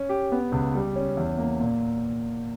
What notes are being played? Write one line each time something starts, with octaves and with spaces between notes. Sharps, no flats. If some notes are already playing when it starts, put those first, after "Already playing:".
Already playing: C#4
G4
B3
C#2
G3
C#4
E2
A#3
A#2